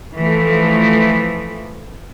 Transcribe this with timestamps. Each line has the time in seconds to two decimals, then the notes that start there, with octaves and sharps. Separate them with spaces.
0.17 E3 F3 A3